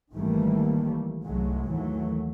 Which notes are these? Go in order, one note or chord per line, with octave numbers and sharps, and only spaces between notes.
G#1 D#3 E3 G3 A3 A#3
C2 G#2 F#3 G#3 A3
D#2 E3 F#3 A3